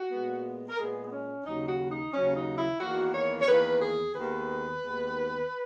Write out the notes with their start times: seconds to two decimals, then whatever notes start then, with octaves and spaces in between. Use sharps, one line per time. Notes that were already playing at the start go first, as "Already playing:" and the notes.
Already playing: F#4
0.12 A#2 G#3 B3
0.69 A#4
0.78 A#2 G#3 B3 G#4
1.06 B3
1.12 C#4
1.46 D#2 C#3 F#3 D#4
1.68 F#4
1.91 D#4
2.13 D#2 C#3 F#3 C#4
2.36 D#4
2.58 E4
2.80 E2 D#3 A#3 F#4
3.14 C#5
3.41 C#5
3.48 E2 D#3 A#3 B4
3.81 G#4
4.15 D#2 D#3 G#3 B3 B4
4.83 D#2 D#3 G#3 B3